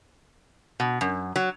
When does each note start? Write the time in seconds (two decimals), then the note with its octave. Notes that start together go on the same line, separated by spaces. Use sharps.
0.80 B2
1.01 F#2
1.36 F#3